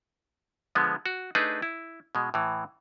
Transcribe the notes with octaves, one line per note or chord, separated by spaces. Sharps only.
D3 F3 G#3 B3
F#4
A3 D4 D#4 G#4 B4
E4
B2 G#3
A2 E3